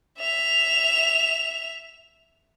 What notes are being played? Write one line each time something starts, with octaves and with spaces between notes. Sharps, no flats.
E5 F7